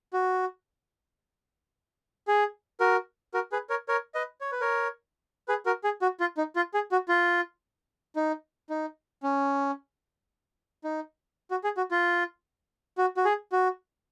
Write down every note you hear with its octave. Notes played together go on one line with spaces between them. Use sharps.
F#4
G#4
F#4 A#4
F#4 A#4
G#4 B4
A#4 C#5
A#4 C#5
B4 D#5
C#5
B4
A#4 C#5
G#4 B4
F#4 A#4
G#4
F#4
F4
D#4
F4
G#4
F#4
F4
D#4
D#4
C#4
D#4
F#4
G#4
F#4
F4
F#4
F#4
G#4
F#4